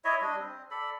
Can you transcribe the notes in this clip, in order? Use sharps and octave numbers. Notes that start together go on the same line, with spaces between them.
E4 C#5 D#5 E5
G3 D4 D#5
C4
A4 D5 B5